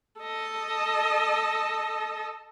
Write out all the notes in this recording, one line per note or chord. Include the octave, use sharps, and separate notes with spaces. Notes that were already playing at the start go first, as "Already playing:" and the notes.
A4 D#5